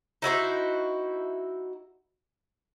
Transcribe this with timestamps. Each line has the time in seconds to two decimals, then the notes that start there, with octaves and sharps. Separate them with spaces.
0.22 D#4 E4 F#4 C5